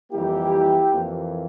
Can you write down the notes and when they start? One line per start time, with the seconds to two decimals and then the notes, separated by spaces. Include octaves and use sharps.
0.11 F2 E3 G3 A#3 E4 G4
0.93 F2 E3 A#3